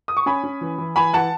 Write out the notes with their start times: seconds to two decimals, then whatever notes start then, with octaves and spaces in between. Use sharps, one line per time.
0.08 D#6
0.17 C#6
0.26 C#4 G#5 B5
0.44 C#4
0.61 E3
0.78 E3
0.96 E3 G#5 B5
1.14 E3 F#5 A5